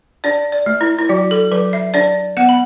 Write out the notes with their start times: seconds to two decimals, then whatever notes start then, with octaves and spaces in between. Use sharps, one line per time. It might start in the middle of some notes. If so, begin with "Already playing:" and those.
0.24 D4 D5
0.52 D5
0.66 A3
0.81 E4
0.99 E4
1.09 F#3 F#4
1.31 A4
1.51 F#3 B4
1.73 E5
1.94 D4 D5
2.37 B3 F#5
2.49 B5